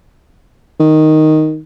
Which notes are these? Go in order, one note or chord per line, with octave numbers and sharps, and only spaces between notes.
D#3